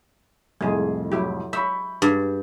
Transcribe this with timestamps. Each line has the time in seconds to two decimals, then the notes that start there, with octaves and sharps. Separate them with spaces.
0.61 C2 F2 A2 G#3 G#4
1.12 F#3 E4 G4
1.53 E5 B5 C#6 G6
2.02 G2